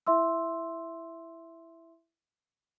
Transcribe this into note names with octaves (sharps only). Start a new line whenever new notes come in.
E4 E5 C6 E6